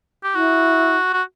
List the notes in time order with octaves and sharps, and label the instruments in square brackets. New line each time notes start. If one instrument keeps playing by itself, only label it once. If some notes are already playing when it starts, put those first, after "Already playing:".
[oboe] G4
[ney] E4 [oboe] F#4
[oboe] F#4